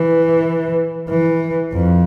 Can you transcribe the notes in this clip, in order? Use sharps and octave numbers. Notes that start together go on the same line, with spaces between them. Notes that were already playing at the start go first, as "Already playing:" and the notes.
Already playing: E3
E3
F2